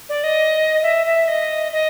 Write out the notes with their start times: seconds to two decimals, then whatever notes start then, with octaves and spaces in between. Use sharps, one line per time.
0.09 D5
0.24 D#5
0.82 E5
1.06 E5
1.28 D#5
1.72 D#5